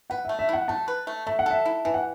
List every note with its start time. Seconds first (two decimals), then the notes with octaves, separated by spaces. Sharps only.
0.10 B4 F#5
0.25 A3 E5
0.39 E5
0.49 E4 F#5
0.68 A3 A5
0.88 B4
1.07 A3
1.27 A3 E5
1.39 F#5
1.46 A4 E5
1.65 E4
1.85 E3 E5
1.94 F#5